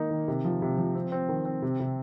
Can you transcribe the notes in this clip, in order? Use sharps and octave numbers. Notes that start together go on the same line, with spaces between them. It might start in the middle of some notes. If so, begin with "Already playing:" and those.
Already playing: D#3 A#3 D#4
D#3
C3
F3
C3
F3
C4
C4
D#3
C4
C3
C3